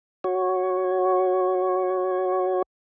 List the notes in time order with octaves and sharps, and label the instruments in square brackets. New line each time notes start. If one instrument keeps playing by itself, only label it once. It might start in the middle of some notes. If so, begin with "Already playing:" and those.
[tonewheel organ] F#4 C#5